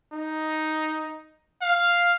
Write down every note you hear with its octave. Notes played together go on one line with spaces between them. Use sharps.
D#4
F5